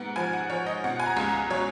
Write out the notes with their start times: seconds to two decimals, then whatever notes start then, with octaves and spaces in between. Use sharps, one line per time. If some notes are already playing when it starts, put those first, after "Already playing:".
Already playing: G#2 B3 F#5
0.16 F3 G#5
0.33 F#5
0.49 F3 C#5
0.66 D#5
0.84 B2 F#5
1.00 G#5
1.06 A#5
1.17 C#2
1.29 A#5
1.50 F#3 C#5